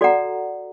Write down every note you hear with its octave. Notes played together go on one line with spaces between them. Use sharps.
F#4 A4 D5 F#5 A#5